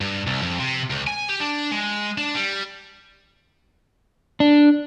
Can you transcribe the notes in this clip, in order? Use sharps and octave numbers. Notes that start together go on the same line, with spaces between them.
G2
C2
F2
C3
C#2
G#5
G4
D4
G#3
D4
G3
D4